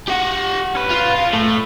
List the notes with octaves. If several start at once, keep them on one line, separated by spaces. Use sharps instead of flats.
G4 F#5
C#4 B4
F4
G#4 F5
A2 A3